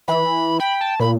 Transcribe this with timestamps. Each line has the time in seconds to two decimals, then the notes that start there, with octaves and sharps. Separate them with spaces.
0.08 E3 B5
0.60 G5 B5
0.81 A5
1.00 A#2 B5